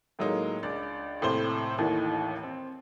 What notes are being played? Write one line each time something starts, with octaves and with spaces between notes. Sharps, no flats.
A2 F#3 G#3 A#3 D#4
C#2 D4 D5
D#2 A2 C3 C5 G7
A1 D#2 A2 D#3 E3
C4